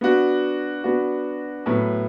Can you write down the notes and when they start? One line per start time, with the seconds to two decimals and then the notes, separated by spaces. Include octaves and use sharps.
0.01 B3 D4 F#4
0.84 B3 D4 F#4
1.66 A2 F#3 B3